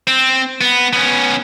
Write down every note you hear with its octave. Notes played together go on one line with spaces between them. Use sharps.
C4
B3
B3 C#4